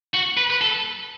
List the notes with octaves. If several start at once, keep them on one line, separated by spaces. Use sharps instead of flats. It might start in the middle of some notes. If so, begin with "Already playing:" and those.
F#4
B4
B4
A4